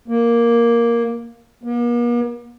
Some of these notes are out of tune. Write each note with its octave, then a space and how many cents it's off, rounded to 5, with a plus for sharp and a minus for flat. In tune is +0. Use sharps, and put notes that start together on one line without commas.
A#3 +5
A#3 +45